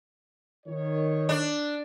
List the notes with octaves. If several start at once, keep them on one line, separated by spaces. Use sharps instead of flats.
D#3 C#5
D4